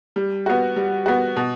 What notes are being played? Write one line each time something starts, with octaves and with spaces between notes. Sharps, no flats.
G3
B3 F#4
G3
B3 F#4
B2